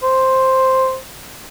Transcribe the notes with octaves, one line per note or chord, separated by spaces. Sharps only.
C5